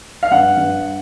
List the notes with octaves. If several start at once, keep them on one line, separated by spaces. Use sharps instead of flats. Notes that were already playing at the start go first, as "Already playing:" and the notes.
F5
G2 F#5
G2